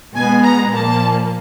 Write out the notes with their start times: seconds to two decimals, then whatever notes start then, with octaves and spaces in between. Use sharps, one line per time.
0.15 B2 G#3 B3 G#5
0.44 A#5
0.72 A#2 F3 A#3 A5